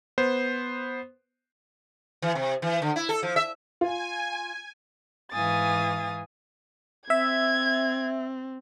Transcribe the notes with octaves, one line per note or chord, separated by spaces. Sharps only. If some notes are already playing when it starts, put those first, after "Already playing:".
B3 C5
E3
C3
E3
D3
E4
A4
F3
E5
F4 G#5
G#2 E3 F5 G#5 D#6 A6
C4 E5 G#6